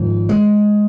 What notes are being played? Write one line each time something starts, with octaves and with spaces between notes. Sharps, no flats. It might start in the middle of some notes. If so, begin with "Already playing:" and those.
Already playing: G#1 G#2 F3
G#3